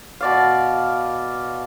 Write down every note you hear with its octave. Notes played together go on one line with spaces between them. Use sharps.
B2 D5 F5